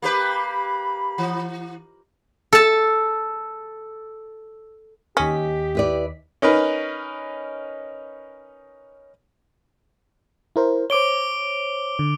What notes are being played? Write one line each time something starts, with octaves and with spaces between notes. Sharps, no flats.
A#3 G4 B4 B5
E3
A4 A5
D#2 C#4 G4 D#5 B6
E4 B4 D5
C#4 D#4 A#4 B4
E4 A#4 C5
C5 C#5 D6 D7 G7
D3